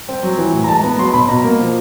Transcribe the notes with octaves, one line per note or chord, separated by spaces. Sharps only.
C4
F#3
E3
A2
A#5
G#3 A5
B3 A#5
F#3 C6
B2 B5
B2 A#5
A#3
F3